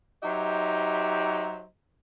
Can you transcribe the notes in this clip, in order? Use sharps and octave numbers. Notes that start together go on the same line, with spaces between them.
F#3 D#4 G4 C5 D#5 E5